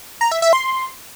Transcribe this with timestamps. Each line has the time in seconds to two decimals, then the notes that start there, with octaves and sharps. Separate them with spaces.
0.21 A#5
0.32 E5
0.42 E5
0.53 C6